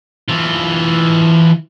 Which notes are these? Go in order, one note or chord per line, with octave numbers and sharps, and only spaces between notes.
E3 F4